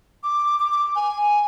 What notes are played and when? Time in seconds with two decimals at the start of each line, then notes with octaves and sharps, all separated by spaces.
0.23 D6
0.60 D6
0.72 D6
0.96 G#5